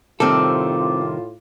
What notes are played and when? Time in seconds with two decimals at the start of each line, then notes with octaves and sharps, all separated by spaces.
0.20 A2 C3 D#3 G3 C4 F4 A4 D6